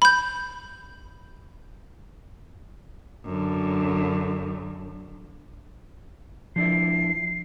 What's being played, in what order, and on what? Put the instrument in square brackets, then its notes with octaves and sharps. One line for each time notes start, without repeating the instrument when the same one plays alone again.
[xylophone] B5 G6
[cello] F#2 D3
[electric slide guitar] F3 D4 E4 [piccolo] C7